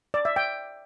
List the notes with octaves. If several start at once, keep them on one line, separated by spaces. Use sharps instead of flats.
D5
E5
G5